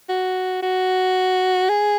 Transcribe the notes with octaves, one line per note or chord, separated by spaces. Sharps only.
F#4
F#4
G#4